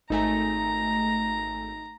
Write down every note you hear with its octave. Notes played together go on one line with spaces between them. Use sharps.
G#1 A3 D#4 G#5 A#5